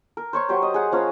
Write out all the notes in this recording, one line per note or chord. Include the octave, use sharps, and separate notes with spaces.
A#4
C5 C#5 C#6
F#3 G4 C5
D#5
G#4 F#5
F3 C#4 F5 A#5